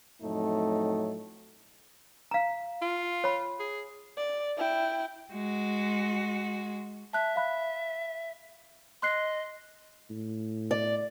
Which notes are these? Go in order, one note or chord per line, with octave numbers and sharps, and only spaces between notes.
F2 A2 F#3 A3 D#4
F5 A#5
F4
C#5 B5
G#4
D5
E4 G5
G#3 F#4
E5 A5 F#6
F5 B5 F#6
D#5 C6 F#6 C7
A2
D5